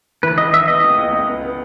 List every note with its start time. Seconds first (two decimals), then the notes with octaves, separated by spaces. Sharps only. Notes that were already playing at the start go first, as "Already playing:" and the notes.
0.23 E3 B4
0.38 C#2 D#5
0.53 E3 E5
0.68 B3 D#5
0.83 C#2
0.98 C#2
1.13 C#2
1.27 B3
1.42 B3